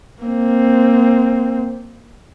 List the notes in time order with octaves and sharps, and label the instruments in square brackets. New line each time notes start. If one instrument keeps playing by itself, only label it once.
[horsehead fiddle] A#3 C4